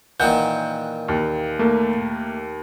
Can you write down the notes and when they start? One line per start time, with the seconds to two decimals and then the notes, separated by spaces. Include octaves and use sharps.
0.20 A#2 D#3 E3 F#5 G6
1.08 D#2
1.59 A3 A#3